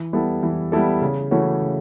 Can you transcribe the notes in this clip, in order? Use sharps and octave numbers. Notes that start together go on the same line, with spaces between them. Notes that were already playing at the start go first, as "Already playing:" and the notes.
Already playing: E3
G3 B3 E4 A4
E3
G3 B3 E4 A4
C#3
E3 A3 C#4 F#4
C#3